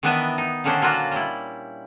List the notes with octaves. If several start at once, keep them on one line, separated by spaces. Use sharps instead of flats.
D#3 E3 B3 D4 D#5 E5
D#4
A#2 D3 D#3 C#4 D4 C5
F#3 A#3 F4 F#4
G3 E4